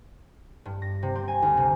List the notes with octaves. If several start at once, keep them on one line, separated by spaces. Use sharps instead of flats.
G2
A#6
C3
C4
G#5
D2
C3